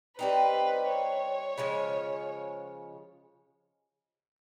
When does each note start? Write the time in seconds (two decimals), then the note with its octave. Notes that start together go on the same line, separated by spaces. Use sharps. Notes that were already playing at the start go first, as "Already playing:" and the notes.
0.19 G3 C4 D#4 B4
0.89 C#5
1.58 C#3 F3 G#3